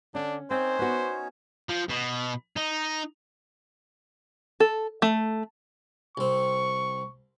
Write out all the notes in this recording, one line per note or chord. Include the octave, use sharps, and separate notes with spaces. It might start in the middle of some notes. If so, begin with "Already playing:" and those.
D3 C#4 D4
A#3 C4 C#4 D#4 C5 C#5
B3 F#4 B4
F3
B2
D#4
A4
A3
C2 C4 C#6